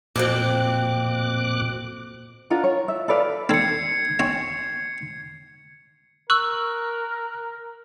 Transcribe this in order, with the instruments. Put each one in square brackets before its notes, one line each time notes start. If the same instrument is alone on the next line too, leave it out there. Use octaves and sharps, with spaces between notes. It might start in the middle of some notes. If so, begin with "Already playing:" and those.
[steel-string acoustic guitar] F2 F#3 C4 [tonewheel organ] A#2 D6 F#6
[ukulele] D4 F4 A#4 F#5
C#5
E5
A4 B4 D5 F5
[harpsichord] C4 A4 [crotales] G#6 C7 C#7
[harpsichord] C4 C#5 G#5
[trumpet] A#4 [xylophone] C#6 E6 [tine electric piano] F#6